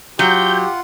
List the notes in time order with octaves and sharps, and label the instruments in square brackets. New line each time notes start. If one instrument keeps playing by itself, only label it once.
[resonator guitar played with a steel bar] F#3 [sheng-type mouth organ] F4 F#5 [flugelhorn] G4 [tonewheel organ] G6